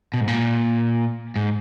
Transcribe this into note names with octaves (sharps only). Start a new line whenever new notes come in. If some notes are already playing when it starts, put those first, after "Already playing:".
B2
G#2
A#2
G#2